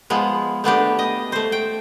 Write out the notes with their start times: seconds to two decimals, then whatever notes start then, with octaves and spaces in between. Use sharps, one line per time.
0.10 F3 G#3 B3
0.64 A3 B3 D4 G4
0.99 D#5
1.32 A3 C5
1.52 G5